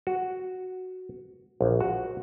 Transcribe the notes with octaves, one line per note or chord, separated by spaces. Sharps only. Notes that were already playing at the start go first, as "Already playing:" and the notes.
F#4
A#1
F#4